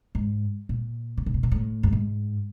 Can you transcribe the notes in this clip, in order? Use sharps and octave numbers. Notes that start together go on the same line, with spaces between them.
G#2
A#2
C#3
C3
B2
A#2
A2
G2
G#2